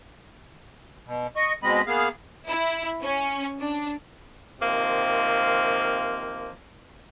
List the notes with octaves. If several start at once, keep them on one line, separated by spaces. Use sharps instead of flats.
B2
D#5 C#6
B2 G#3 C4 D#5 B5
A#3 B3 G#4 F5
E4
C#4
D4
C3 D#3 F3 A#3